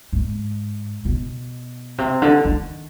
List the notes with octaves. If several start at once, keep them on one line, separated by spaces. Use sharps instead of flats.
G#2
B2
C3
D3
D#3